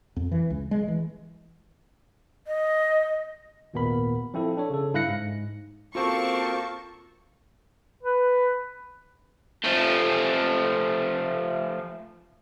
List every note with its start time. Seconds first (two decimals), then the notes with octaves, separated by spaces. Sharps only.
0.16 F2
0.32 E3
0.50 C#2
0.71 G#3
0.88 E3
2.47 D#5
3.74 G#1 D#2 A#2 B3 A#4 B5
4.34 F3 C4 E4 A4
4.57 D4 A4 C#5
4.70 C#3 A4
4.94 G2 E4 F5 F#6 A#6 C#7
5.08 G#2
5.95 A#3 C4 F4 F#4 A4 A5 C#6
8.03 B4
9.64 F3 A3